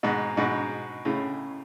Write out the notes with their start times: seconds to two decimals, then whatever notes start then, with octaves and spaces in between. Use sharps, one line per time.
0.03 G#2 B2
0.37 G#2 B2
1.05 A2 C#3